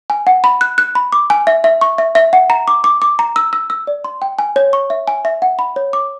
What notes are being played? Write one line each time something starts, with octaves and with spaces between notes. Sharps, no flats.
G#5
F#5
B5
F#6
F#6
B5
D6
G#5
E5
E5
C#6
E5
E5
F#5
A#5
D6
D6
D6
A#5
E6
E6
E6
D5
C6
G5
G#5
C#5
C#6
E5
G#5
E5
F#5
B5
C#5
D6